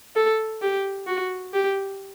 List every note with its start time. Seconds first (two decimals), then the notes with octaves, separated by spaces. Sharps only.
0.16 A4
0.62 G4
1.07 F#4
1.54 G4